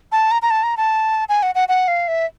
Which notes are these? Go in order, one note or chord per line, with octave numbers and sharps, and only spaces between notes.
A5
A#5
A#5
A5
A#5
A5
G#5
F#5
F#5
F#5
F5
E5